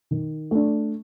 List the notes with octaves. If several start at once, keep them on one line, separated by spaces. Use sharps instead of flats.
D#3
A3 D4